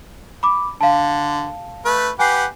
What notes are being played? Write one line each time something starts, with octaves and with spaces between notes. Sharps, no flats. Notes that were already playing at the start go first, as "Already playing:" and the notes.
B5 D6
D3 F5 A5
A3 B4
G4 B4 F#5 G#5 C7